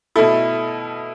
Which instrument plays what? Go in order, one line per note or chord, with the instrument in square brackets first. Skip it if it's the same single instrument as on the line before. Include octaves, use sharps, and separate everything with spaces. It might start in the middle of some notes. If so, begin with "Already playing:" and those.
[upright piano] B2 A3 E4 A4